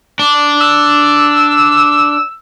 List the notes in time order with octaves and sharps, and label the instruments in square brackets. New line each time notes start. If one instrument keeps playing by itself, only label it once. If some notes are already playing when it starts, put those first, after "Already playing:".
[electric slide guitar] D4
[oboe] E6